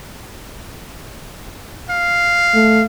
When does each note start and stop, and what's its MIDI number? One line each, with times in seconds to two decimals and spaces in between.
1.90 2.86 77
2.55 2.84 57